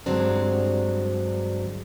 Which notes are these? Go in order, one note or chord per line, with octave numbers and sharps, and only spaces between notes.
G2 D3 F#3 G#3 C4 D4